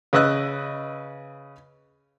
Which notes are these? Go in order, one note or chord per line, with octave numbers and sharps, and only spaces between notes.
C#3 B4 D#5 E6 F#6